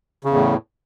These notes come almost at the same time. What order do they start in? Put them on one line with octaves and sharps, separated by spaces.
C#3 E2 A2